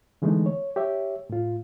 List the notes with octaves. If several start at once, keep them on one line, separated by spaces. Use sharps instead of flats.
D3 E3 G#3 A3 B3 D#4
C#5
G4 C#5 E5
A2 F4